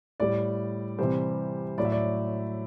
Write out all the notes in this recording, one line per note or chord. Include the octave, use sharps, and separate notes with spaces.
A2 G3 D5
C3 E3 G3 C5
A2 F#3 D5
E5
D5